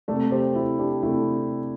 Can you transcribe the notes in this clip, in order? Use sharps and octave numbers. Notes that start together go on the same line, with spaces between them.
C3 A3 A4 D5
G4 C5
E4
D4 G4
C3 A3 E4